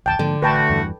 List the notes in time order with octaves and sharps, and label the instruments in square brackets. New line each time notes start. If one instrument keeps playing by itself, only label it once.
[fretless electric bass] A#1 D#2 [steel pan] G5 A5
[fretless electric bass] G#2 F3 A#3 [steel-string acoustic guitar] D3
[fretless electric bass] A1 [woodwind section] A3 F#4 [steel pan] B4 G5 A5
[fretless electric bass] E2 G2 E3